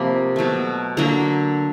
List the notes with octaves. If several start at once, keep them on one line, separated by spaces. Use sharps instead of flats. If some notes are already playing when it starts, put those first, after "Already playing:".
Already playing: C3 F3 A#3 B5
B2 F#3 A3
D3 F#3 A#3 A#5